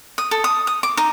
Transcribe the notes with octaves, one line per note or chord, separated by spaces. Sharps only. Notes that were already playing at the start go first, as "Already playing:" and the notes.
D#6
A4
D#6
D#6
D6
D#4